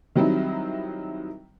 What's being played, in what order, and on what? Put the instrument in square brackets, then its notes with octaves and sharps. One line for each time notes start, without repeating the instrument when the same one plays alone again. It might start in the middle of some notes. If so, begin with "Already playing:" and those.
[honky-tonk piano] D#3 F#3 G3 C4 D#4 E4